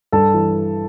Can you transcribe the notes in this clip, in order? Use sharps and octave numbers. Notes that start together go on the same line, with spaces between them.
G2 A4 A5
E3